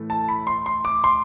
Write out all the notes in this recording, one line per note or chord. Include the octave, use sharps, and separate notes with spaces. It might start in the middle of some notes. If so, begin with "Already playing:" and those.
Already playing: A2 E3 A3
A5
B5
C6
C6
D6
C6